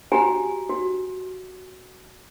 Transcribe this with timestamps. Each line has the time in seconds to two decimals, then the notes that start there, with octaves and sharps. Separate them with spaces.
0.12 F#4 G4 G#5 A#5
0.70 F#4